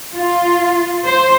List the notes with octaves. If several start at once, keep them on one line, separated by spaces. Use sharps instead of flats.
F4
C5